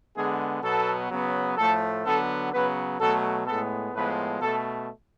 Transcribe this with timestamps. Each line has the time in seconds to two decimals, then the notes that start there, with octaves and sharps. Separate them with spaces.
0.15 D3 G#3 B3 G#4
0.63 B2 F#3 B3 A4
1.10 C#3 F#3 B3
1.57 A2 F3 A3 A4
2.05 D3 F#3 B3 A4
2.52 C#3 F#3 B3 B4
3.00 B2 F#3 A3 A4
3.46 A2 G#3 B3 A4
3.93 A2 F3 G#3 B3 B4
4.41 B2 A3 A4